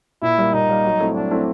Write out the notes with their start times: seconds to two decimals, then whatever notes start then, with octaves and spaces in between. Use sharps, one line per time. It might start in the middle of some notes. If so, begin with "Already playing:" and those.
0.22 A#2 E4
0.38 G3 A#3
0.53 A#2 D#4
0.69 G3 A#3
0.85 F#3
1.00 A3 C4 E4
1.15 F#3 D4
1.31 A3 C4 E4